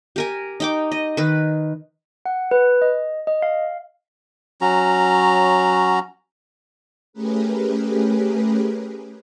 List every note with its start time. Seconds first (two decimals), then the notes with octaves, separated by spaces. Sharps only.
0.16 G4 A#4 G#5
0.60 D#4 G5 D6
0.92 D#5
1.17 D#3 B4
2.26 F#5
2.51 B4
2.82 D#5
3.27 D#5
3.42 F5
4.61 F#3 C#4 F#4 A#5
7.13 A3 C#4 G4 G#4 A#4 B4